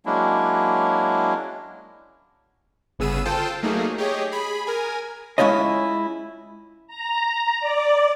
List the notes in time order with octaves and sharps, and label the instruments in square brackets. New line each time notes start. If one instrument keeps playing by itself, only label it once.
[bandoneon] F#3 G#3 A#3 C#4 D4 E4
[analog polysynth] G1 C#3 B3 G#4 E6 D#7
F4 A4 C5 G5 A5
F#3 A3 A#3 D#4 G#4
G4 G#4 C#5 D#5
G#4 B5
A#4 G#5
[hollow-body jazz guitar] G#3 C#4 E4 F4 C#5 D#5
[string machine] A#5
D5